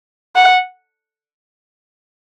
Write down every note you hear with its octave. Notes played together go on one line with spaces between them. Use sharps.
F#5